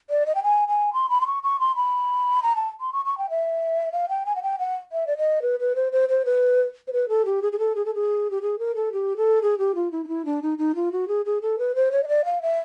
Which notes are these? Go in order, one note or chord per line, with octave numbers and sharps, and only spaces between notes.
D5
D#5
G5
G#5
G#5
C6
B5
C6
C#6
C#6
C6
B5
A#5
A5
C6
C#6
C#6
G5
E5
F5
G5
G#5
F#5
G5
F#5
E5
D5
D#5
B4
B4
C5
C5
C5
B4
C5
B4
A4
G4
G#4
G#4
A4
G#4
A4
G#4
G4
G#4
A#4
A4
G4
A4
G#4
G4
F4
E4
D#4
E4
D4
D#4
D#4
F4
F#4
G#4
G#4
A4
B4
C5
C#5
D#5
D5
F5
E5